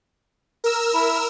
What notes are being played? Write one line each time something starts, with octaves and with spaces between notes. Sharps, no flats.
A#4 E6
E4